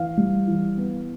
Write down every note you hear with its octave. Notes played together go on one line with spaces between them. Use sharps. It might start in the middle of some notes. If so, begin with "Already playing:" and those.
Already playing: E3 F5
G3
E3
B3